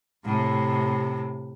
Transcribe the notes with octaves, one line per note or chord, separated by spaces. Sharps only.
A2 C3